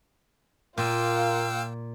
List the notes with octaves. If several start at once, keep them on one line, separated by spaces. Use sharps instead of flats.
A#2 A#3 F4 F5 G5 E6